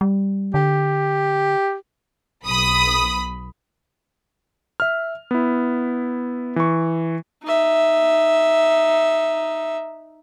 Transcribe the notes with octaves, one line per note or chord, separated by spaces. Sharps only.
G3
D3 G4
B1 B5 D#6
E5 F6
B3 E4
E3 C#6
D#4 E5